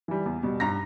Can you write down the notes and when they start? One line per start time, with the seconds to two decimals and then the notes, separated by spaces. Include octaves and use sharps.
0.08 E3 G3
0.26 E2
0.43 B2 G3
0.60 G2 A#5 A#6